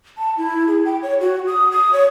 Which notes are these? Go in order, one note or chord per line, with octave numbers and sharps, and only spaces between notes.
A5
E4
G#4
G5
C#5
F#4
D#6
D#6
C#5